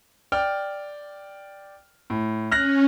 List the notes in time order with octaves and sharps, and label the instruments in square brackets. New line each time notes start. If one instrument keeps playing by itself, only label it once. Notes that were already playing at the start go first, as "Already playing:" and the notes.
[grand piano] D5 G5 F6
A2
[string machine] C#4 [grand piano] F6 F#6 A#6